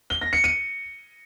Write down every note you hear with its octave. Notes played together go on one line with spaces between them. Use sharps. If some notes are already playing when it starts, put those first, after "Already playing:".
G7
A#6
C#7
D#7